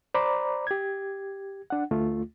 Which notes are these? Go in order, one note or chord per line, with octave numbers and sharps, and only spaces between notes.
C5 D5 A#5 B5 D6
G4 G#6
D4 F#5
D2 A3 F4